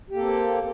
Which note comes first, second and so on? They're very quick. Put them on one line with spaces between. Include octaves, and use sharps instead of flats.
G4 A#3 A4 C4